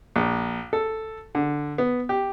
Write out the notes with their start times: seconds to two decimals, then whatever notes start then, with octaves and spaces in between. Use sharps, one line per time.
0.16 A#1
0.73 A4
1.35 D3
1.78 B3
2.09 G4